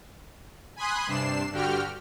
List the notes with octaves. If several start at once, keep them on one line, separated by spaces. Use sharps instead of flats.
G#5 B5 C6 D#6 F#6
G2 C3 D4 C7 E7
G2 D3 F#4 G4 G5 F6